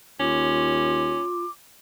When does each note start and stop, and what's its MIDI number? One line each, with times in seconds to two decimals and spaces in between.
0.20 1.17 39
0.20 1.24 61
0.20 1.44 65
0.20 1.51 86